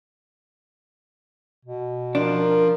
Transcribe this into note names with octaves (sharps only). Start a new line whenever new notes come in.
B2
F3 D4 A#4